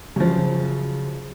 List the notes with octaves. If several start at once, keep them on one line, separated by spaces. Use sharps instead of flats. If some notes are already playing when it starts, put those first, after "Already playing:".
F#2 C#3 F3